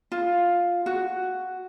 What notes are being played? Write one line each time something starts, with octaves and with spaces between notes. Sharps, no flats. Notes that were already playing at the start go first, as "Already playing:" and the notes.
F4
F#4